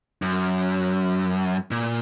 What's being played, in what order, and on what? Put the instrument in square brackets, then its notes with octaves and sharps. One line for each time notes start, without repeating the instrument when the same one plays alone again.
[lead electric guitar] F#2
A#2